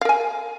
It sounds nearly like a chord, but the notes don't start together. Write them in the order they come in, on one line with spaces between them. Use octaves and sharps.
F5 A#4 G#5